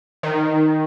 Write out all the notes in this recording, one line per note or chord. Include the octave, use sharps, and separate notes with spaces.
D#3